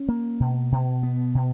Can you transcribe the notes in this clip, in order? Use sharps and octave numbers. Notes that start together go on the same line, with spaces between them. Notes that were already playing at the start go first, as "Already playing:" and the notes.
Already playing: C#4
A#3
B2
B2
B3
B2